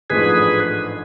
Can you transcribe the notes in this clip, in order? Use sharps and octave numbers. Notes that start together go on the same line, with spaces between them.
A1 G#2 F3 A3 D4 G#4 B4